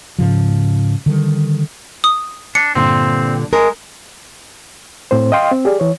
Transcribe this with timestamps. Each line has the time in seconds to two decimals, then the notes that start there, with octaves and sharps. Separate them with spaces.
0.19 G#2 C#3 F3
1.06 D3 D#3 G3
2.04 D#6
2.55 D4 C#7
2.75 G2 A#2 D3 C4
3.53 G#3 A#4
5.11 A2 C4 C5
5.32 D#5 F5 G5 C6
5.52 C4
5.65 G4 G#4 D5
5.80 E3 C#5